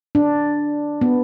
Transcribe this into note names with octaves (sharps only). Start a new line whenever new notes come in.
D4
B3